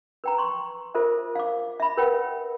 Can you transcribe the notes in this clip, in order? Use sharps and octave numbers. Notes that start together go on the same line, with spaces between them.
B4 G5 A#5
C6 C#6
F4 A4 A#4 C5 E5
F5 D6
E5 B5
A#4 B4 C#5 F#5 G5